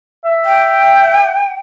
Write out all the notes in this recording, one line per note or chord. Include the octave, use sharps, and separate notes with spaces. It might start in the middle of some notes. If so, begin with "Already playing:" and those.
E5
G5